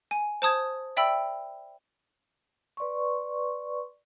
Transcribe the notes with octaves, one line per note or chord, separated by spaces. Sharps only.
G#5
C5 A5 D#6 G#6
D5 E5 G5 B5 E6
B4 D5 C6 C#6